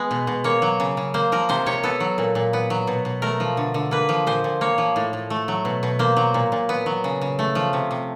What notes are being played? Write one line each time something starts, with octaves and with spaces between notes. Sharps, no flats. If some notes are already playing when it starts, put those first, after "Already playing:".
Already playing: G#3 B3
B2
B2
A#3 C#5
F#3
C#3
C#3
A#3 C5
F3 A#4
C3 C5
C3 C#5
B3 A4
F#3
A#2
A#2
B3
F#3
B2
B2
A3 A#4
F3
D3
D3
A#3 B4
F3
A#2 C5
A#2
A#3 C#5
F3
A2
A2
A3
F#3
B2
B2
A#3 C5
F#3
A#2
A#2
B3
F#3
C#3
C#3
A3
F3
C3
C3